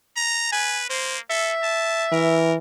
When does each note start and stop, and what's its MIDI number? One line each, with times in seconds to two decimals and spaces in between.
0.16 0.48 82
0.52 0.87 71
0.52 0.80 80
0.90 1.19 58
0.90 1.17 72
1.30 1.52 69
1.30 2.40 76
1.63 2.06 81
2.12 2.58 52
2.12 2.54 70